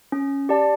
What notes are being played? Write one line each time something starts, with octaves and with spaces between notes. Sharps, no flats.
C#4
G4 D5 A5